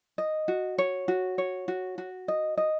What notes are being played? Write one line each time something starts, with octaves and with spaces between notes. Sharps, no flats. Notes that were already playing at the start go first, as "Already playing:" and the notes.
D#5
F#4
C#5
F#4
C#5
F#4
F#4
D#5
D#5